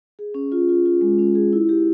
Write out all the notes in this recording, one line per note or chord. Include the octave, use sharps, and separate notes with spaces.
G#4
C#4
F4
F4
F4
G#3
C#4
G#4
E4
G4